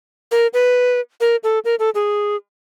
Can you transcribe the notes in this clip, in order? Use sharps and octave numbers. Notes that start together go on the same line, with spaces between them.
A#4
B4
A#4
A4
A#4
A4
G#4